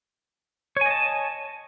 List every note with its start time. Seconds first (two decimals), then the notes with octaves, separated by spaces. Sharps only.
0.77 C#5
0.81 G#5
0.86 D#5
0.91 A5